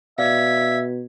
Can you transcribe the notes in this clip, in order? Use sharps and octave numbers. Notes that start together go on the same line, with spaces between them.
B2 D5 E5 F5 G#6 B6